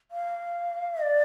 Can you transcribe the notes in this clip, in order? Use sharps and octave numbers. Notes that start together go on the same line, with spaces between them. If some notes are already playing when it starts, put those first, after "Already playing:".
F5
D5